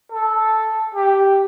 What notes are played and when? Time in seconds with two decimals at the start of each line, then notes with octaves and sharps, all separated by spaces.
0.12 A4
0.95 G4